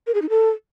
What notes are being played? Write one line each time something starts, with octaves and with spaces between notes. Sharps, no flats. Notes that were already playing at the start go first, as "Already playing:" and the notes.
A#4
G#4
D#4
A4